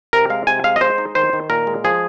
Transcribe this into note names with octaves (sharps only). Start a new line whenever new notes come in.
C3 A#4
G#3 F5
C3 G#5
G#3 F5
D#5
G#3 C5
D#4
D#3 C5
D#3
A#2 A#4
G#3
F3 G#4